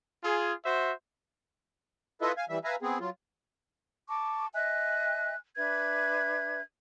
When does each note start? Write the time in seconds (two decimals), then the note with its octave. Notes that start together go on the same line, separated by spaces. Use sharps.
0.23 F4 G#4
0.65 F#4 C5 E5
2.22 E4 F4 A4 B4 D#5 E5
2.37 F5 G#5
2.49 E3 G3 E5
2.64 B4 E5 F5 G#5 A#5
2.82 B3 C4 G#4
3.00 F#3 F4
4.08 A5 C#6 D6
4.53 D#5 E5 G#5 F#6
5.57 D4 B4 E5 G#6